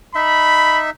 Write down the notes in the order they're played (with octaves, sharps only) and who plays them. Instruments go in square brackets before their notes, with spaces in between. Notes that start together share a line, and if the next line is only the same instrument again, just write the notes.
[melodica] D#4 E5 [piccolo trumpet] B5